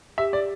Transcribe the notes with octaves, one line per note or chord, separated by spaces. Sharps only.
G4 E5
D5